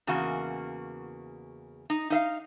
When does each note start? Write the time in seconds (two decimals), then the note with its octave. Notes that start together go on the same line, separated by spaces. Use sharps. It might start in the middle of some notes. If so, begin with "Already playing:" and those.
0.07 E2 C#3 A#3 F#4
1.90 D#4
2.10 D#4 E5 F5